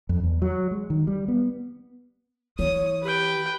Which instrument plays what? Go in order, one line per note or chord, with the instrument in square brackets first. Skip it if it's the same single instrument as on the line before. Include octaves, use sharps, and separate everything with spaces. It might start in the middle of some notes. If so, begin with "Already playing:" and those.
[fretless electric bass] F2
E2
F#3
G#3
D#3
G3
B3
[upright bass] E3 [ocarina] C#5 [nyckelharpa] D#6
[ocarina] G4 [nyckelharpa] B4 G5